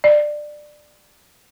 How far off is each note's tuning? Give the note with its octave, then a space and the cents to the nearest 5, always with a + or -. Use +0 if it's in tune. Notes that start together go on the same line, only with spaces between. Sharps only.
D5 +15